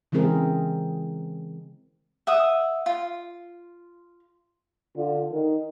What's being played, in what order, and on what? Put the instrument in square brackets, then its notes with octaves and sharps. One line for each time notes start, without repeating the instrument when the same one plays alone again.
[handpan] C#3 E3 G#3 C4 G#4 A#4
[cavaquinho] E5 F#5 D#6
F4
[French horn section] D3 F4
D#3